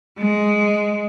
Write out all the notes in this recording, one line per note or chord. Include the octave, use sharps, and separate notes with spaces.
G#3